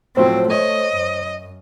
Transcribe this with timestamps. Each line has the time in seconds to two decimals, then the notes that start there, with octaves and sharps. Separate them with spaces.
0.17 A2 F3 F#3 C4 C5
0.50 A3 C#5 D#5
0.95 F#2